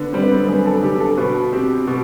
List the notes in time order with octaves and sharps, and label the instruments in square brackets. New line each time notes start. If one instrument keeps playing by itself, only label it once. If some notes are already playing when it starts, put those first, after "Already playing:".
Already playing: [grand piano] D3 [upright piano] B3
[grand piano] G3 [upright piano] C4
[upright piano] B3
C4
[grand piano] F#2 [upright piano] B3
[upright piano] A4
[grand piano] D3 [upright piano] G4
[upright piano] A4
[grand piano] B2 [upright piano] B4
[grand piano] C4 [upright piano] G4
[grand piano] B2 [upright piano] F#4